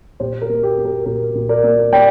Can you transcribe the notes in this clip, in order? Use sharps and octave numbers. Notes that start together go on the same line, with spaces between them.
A#2 G4 C5
A#4
A#3
G4
A#3
A#4
A#2 A#4
A#2
A#4 D5
A#3
A#3 D5 G5